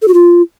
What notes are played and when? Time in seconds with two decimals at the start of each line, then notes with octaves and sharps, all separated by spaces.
0.02 A4
0.08 F#4
0.14 F4